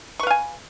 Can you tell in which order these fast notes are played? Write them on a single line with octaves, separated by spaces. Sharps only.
C#6 B4 F5 G#5